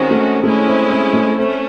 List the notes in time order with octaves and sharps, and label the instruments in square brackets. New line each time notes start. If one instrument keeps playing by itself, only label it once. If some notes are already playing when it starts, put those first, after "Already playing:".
Already playing: [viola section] D#3 G#3 C#4 F#4 [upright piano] C4
[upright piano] A3
[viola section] G#3 C#4 E4 [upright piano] A3
[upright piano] C4
C4
A3
[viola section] A3 C#4 [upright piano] C4